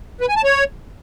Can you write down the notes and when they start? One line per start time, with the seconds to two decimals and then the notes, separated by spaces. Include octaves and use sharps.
0.21 B4
0.29 G#5
0.36 A5
0.44 C#5